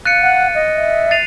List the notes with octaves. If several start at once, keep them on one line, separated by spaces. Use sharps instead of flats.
F5 F#6 A6 C#7 D#7
F#5
D#5
E5
A6 C7 D#7 F7